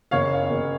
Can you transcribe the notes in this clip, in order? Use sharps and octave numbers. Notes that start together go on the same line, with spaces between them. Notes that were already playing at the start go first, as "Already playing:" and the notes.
F#1 C#5 F5
F#1